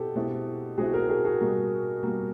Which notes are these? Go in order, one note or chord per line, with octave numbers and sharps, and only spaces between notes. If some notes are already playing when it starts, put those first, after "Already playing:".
Already playing: B2 C4 E4 G4 A4
B2 G#3 C4 E4
B2 G#3 C4 E4 F#4 G#4
G#4 A#4
G#4 A#4
F#4 G#4
B2 G3 A#3
B2 G3 A#3